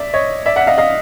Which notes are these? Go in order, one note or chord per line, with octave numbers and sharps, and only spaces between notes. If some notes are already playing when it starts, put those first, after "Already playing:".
Already playing: D5 E5
C#5 D#5
D5 E5
E5 F#5
D#5 F5
D#5 F5